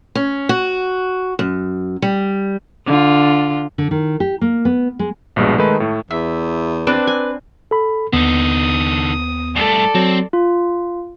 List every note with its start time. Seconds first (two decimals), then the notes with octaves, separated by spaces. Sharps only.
0.15 C#4
0.49 F#4
1.39 F#2
2.02 G3
2.86 D3 F4
3.78 D3
3.91 D#3
4.20 G4
4.41 A#3
4.65 B3
4.99 G#3
5.36 A#1 G2 B2 G#3
5.58 D#3 G#3 A3 D#4 A4 B4
5.80 A2 A3
6.11 E2 E5
6.87 C4 D4 B4
7.07 G#5
7.71 A4 B5
8.13 D#2 D3 B3 D#4 D#6
9.56 G2 A3 A4 D5
9.95 F#3 C4
10.33 F4